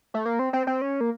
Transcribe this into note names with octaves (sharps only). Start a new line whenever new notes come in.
A3
A#3
C4
C4
C4
C#4
A#3